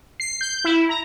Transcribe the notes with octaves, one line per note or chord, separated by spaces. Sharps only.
C7
G6
E4
A#5